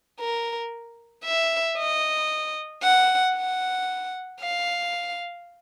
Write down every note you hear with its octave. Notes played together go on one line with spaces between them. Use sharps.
A#4
E5
D#5
F#5
F#5
F5